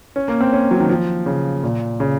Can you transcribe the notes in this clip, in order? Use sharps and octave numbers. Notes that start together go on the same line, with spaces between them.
C#4
A#3
C4
C#4
F#3
D#3
F3
C#3
A#2
C#3